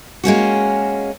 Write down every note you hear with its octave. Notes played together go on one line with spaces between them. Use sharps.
G#3 A#3 C#4 F#4